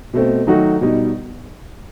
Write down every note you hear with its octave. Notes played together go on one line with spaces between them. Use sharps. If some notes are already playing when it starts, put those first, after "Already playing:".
B2 A3 C4
D#3 F#3 A3 D#4 F#4
B2 G3 D#4